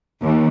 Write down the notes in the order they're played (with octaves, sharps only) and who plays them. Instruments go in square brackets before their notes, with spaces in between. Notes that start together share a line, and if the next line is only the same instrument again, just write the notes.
[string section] D#2